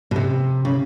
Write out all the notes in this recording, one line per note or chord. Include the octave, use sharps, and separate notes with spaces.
B2
C3
C#3